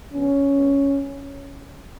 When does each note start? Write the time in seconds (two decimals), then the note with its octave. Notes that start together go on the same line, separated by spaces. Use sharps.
0.12 D3 F#3 B3 C#4
0.53 B2 G#3 B3